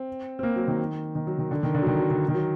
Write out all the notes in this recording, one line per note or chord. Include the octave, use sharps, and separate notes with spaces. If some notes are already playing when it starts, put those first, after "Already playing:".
Already playing: C4
C4
A#3
F#3
D#3
D#3
F#3
D#3
D3
D#3
D3
F#3
D#3
F#3
D3
D#3
F#3